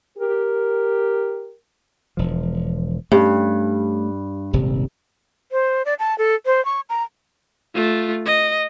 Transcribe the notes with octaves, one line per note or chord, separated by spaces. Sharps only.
G4 A#4
E1 F3
G2 A3 C#4
D#1 G#1 C3
C5
D5
A5
A4
C5
C#6
A#5
A3 F4
D#5